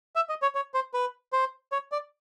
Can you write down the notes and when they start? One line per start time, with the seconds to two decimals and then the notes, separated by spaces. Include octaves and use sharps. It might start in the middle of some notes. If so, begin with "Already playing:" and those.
0.16 E5
0.29 D#5
0.42 C#5
0.55 C#5
0.74 C5
0.94 B4
1.33 C5
1.72 C#5
1.92 D5